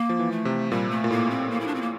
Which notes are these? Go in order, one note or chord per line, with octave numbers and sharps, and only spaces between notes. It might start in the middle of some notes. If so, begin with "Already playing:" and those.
Already playing: A#3
F3
E3
A3
C3
A#2 G3
A3
A#2
A2 A#3
C4
A#3
E4
D4
C4
A#3